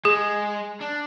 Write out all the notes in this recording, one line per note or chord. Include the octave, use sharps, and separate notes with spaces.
G#3 G#4
D4